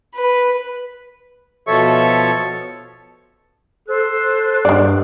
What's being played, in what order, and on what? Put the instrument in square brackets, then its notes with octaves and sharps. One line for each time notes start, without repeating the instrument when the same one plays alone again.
[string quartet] B4
[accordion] B2 F3 A4 C#5 E5 C#6
[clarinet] A4 [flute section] C5 F#6
[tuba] G2 [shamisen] D#3 D5